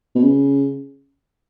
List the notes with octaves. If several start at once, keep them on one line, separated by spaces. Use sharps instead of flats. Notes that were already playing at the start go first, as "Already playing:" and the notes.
B2
C#3